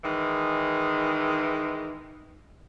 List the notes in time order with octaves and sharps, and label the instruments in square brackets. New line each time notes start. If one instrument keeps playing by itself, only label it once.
[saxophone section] D#3 E3 G#3